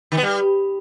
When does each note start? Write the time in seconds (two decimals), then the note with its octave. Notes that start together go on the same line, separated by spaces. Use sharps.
0.12 D#3
0.17 B3
0.23 G3